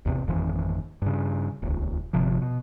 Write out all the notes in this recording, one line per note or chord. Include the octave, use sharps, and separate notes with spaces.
A1 E2 C3
G#1 F2 D#3 E3
G2 C#3
D#1 C#2
G1 C3 F3
B2